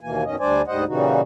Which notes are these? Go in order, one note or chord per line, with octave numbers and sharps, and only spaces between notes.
D#2 B2 E3 A#3 G#5
F#2 B2 D#3 C#4 D#5
D2 G3 D4 C5 D5 G#5
D2 G#2 G3 C5 D#5 F#5
A#2 C#3 E3 G3 D#4 F#4